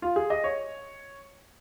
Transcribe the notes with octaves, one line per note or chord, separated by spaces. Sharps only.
F4
G#4
D#5
C#5